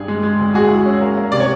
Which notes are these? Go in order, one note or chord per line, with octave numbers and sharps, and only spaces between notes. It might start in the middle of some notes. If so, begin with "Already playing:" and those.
Already playing: G2 G#4
G#3
G#3
D2
G#3 F#4 G#4
E4
C#4
A#3
A#3
C3 D5
C#5